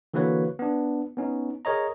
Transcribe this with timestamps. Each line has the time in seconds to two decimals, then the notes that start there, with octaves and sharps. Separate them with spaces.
0.14 D3 E3 A#3 F#4 B4 C#5
0.59 B3 D4
1.17 B3 C#4 D#4
1.65 G#4 A#4 C#5 D#5 A#5